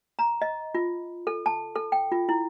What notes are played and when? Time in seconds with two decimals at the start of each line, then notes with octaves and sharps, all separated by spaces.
0.19 A#5
0.42 D#5
0.75 F4
1.27 A4
1.46 A5
1.75 A4
1.92 G5
2.12 F4
2.29 E4